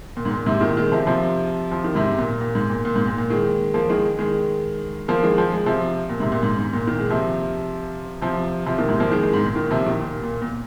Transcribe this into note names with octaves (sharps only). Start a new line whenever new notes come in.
A#2
G#2
A#2
G#2 C3
A#2 D#3
D#3 G#3
C3 F3
C3 F3
F3
D#3
G#2 C3
G#2
A#2
A#2
G#2
A#2
A#2
G#2
A#2
A#2
D#3 G#3
F3 A#3
D#3 G#3
D#3 G#3
F3 A#3
D#3 G#3
F3
G#3
C3 F3
A#2
G#2 C3
A#2
G#2
G#2
A#2
A#2 D#3
G#3
C3 F3
C3 F3
C3 F3
A#2 D#3
G#2 C3
F3 A#3
D#3 G#3
D#3 G#3
G#2
A#2
A#2 D#3
C3 F3
A#2 D#3
A#2
A#2
A#2